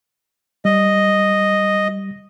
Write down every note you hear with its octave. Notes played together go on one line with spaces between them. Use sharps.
G3 D#5